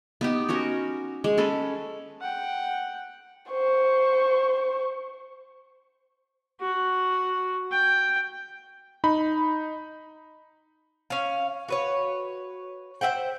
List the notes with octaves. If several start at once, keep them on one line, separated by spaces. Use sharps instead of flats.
B3 D#4 G4
C#4 F#4 A#4 C#5
G#3
C#4 A4 B4
F#5 G5
C5 C#6
F#4
G5
D#4 B5
C#4 F5
F#4 B4 C#5
C5 E5 F#5 G5